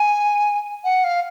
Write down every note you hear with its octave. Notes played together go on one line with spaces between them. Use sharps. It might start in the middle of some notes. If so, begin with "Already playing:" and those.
Already playing: G#5
F#5
F5